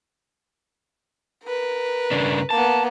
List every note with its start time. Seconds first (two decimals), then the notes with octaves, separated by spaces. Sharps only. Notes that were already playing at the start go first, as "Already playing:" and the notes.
1.45 A#4 B4
2.11 G2 C#3 D4
2.50 A#3 B3 A5